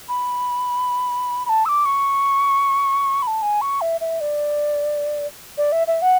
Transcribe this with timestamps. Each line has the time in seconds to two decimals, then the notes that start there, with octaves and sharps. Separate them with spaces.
0.09 B5
1.46 B5
1.49 A5
1.65 E6
1.69 D6
1.85 C#6
3.22 B5
3.27 A5
3.42 G#5
3.61 C#6
3.81 E5
4.01 E5
4.21 D5
5.58 D5
5.72 E5
5.87 E5
6.02 F#5